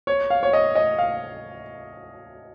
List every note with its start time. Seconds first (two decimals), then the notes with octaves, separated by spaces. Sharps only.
0.07 C#5
0.30 F5
0.43 C#5
0.53 D#5
0.75 D#5
0.98 F5